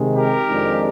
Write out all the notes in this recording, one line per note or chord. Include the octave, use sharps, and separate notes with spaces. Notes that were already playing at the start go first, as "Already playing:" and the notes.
Already playing: C3 D#3 G#3
G4 A#4
F2 D#3 G#3 D4